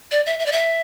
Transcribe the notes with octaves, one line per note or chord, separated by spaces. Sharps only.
D5
E5
E5
D5
E5